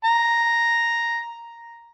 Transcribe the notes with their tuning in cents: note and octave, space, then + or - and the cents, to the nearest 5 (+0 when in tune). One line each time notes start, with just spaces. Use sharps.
A#5 +0